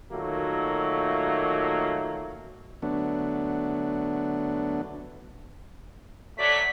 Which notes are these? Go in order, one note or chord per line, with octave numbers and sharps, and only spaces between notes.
A#2 D#3 F#3 A3 A#3
D3 F#3 A3 B3 D4
F#3 A3 D5 B6